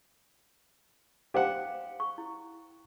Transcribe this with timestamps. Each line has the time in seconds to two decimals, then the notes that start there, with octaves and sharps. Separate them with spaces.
1.34 D#4 G4 C5 F5 F#5 D6
2.00 C#6
2.18 E4